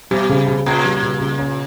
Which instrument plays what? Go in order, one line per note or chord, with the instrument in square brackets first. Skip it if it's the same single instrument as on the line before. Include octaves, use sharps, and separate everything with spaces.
[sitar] B2 [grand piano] G3
[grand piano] C#3
C#3
[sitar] A#2 [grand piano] C#4
[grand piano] G3
C#3
C#3
C#4